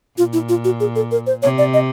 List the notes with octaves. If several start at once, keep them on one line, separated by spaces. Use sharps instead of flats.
A#2 F4
E4
F4
F#4
G#4
A4
A#4
C5
C3 C#5
D5
D#5